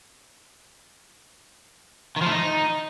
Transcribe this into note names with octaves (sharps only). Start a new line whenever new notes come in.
D#3
F3
A3
D#4